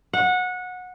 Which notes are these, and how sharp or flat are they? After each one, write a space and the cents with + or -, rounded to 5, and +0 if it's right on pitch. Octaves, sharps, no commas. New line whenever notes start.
F#5 -20